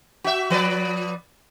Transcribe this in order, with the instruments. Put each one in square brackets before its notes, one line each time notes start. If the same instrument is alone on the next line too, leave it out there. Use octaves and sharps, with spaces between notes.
[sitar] F#4 E5
F3 B4 D5